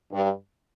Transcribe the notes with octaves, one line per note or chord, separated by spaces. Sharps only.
G2